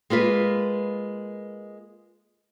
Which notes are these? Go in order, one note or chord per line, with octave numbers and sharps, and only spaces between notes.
G#3 A#3 F4 B4